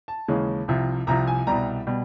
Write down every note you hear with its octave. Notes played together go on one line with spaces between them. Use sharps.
A5
D#2 C#3 E3 G#3 C#4
C2 C3 F3
C2 C3 F3 A#5
G#5
C2 B2 G3 A#5
B2 G3